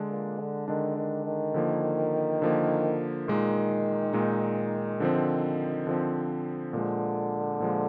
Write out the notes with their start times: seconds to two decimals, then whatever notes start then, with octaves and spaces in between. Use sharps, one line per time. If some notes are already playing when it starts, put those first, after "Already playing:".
Already playing: D3 G#3 D4
0.11 A#2
0.39 D3
0.68 D3 D#3 G#3 D4
0.98 D#3
1.25 D#3
1.54 D3 F3 A#3
2.42 D3 F3 A#3
3.27 A#2 D#3 G#3 D#4
4.13 A#2 G#3 D#4
5.00 D3 F3 C4
5.87 D3 F3 C4
6.73 A#2 D3 F3 G#3
7.60 A#2 F3 G#3